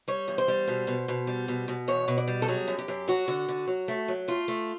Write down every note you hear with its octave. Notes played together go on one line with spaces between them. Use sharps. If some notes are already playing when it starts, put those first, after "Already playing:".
G3 C#5
E2
C5
G3
B2
B2
B2
G3
B2
B2
E2 C#5
B2
D5
G3
A4
F#3 G#4
F#2
G4
F#2
F#3 F#4
D3
D3
F#3
A3
F#3
A3 F4
A3